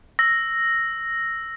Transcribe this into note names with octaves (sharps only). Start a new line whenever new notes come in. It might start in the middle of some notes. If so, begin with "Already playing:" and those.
E6 A#6